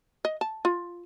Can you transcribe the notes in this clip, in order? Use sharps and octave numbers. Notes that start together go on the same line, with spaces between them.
D#5
A5
F4